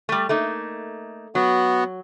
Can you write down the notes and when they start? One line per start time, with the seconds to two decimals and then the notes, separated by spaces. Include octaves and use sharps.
0.09 G3 A3
0.29 A3 A#3 D#4
1.35 F#3 B3 F#4